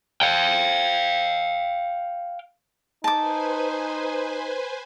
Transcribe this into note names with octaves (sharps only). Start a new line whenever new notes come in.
F5 G5
D#4 B4 C5 G#5 A5 D6